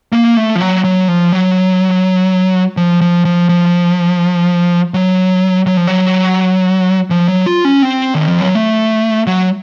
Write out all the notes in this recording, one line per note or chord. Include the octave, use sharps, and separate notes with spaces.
A#3
A3
F3
F#3
F#3
F3
F#3
F3
F3
F3
F3
F#3
F#3
F3
F#3
F3
F#3
F4
C#4
C4
D#3
F3
F#3
A3
F#3